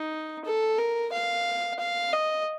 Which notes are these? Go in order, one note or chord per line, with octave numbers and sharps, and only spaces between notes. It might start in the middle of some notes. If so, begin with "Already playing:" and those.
Already playing: D#4
A4
A#4
F5
F5
D#5